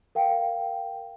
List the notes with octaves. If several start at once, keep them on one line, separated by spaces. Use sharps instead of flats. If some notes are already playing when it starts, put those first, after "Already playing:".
A#4 F5 G5